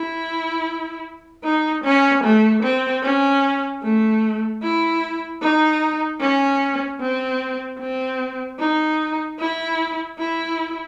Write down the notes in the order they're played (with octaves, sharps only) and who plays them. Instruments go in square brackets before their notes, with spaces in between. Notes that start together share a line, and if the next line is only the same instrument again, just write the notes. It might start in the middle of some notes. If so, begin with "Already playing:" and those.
Already playing: [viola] E4
D#4
C#4
A3
C4
C#4
A3
E4
D#4
C#4
C4
C4
D#4
E4
E4